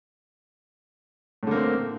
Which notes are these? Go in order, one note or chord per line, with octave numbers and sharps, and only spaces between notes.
A2 D3 A#3 C4